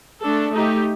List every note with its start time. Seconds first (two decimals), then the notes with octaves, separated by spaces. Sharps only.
0.22 A3 D4 A4
0.52 A3 D#4 G4